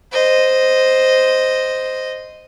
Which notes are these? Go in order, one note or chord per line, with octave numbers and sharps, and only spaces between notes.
C5 D#5